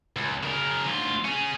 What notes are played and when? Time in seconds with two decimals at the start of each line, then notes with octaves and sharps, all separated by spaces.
0.16 C#2
0.43 C#3 A#4
0.86 D2 F4
1.24 C#4 G#4